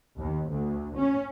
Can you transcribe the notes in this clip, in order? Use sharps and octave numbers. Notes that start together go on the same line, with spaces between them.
D#2
D2
C#4